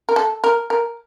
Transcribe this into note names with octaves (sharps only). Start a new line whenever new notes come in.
A#4
A4
A#4
A#4